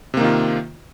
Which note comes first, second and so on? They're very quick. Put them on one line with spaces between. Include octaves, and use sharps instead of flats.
C3 A#3 D#3 F4